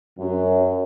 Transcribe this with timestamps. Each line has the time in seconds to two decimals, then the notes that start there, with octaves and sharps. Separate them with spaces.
0.19 F#2